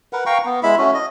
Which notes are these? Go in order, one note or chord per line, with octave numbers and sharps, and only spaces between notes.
A#4 B4 F#5
F5 G5 A#5 C#6
B3
G#3 E4 E5 B5
A3 C#4 F#4
D#5